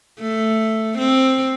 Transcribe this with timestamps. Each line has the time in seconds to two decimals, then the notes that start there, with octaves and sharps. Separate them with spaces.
0.21 A3
0.99 C4